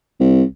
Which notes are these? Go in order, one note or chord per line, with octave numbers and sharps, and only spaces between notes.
C2